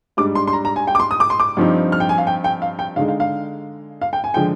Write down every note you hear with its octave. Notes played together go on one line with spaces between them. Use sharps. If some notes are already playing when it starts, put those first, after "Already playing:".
G#2 G3 D4 D6
C6
C6
A#5
A#5
G#5
G5
D6
C6
D#6
D6
C6
D6
G2 F3 C4 D#4
F6
G5
G#5
F5
G5
G5
F5
G5
D3 G#3 D#4 F5
F5
F5
F5
G5
G#5
D3 F3 G#3 G5